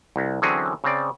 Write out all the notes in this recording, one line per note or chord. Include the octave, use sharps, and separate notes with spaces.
C2
D3 E3 F#3 C4 C#4 G#4
C#3 C4 D5